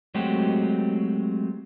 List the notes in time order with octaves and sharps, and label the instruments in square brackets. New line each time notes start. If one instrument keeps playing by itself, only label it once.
[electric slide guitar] F#3 G#3 A3 C4 F#4 G4